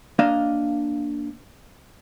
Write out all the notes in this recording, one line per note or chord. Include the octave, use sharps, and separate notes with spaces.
A#3 D4 D#5 F5